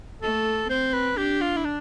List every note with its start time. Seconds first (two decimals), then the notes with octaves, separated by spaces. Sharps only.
0.22 A3 A4
0.69 C4 C5
0.93 B4
1.17 D4 G4
1.41 F4
1.57 E4
1.65 D4